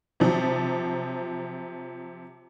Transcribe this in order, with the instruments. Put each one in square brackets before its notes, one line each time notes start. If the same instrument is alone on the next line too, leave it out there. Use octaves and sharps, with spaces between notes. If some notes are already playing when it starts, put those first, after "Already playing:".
[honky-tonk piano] C3 F3 F#3